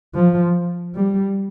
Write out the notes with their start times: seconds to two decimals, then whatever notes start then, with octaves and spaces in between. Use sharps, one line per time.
0.14 F3
0.95 G3